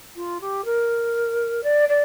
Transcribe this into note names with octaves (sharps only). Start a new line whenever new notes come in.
F4
G4
A#4
D5
D5